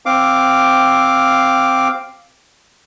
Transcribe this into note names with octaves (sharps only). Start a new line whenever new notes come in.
C4 F5 D6